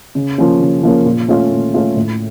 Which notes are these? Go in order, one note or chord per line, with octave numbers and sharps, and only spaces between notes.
C#3
F3 A#3 C#4
C#3
F3 A#3 C#4
A#2
A3 C#4 F4
A#2
A3 C#4 F4
A2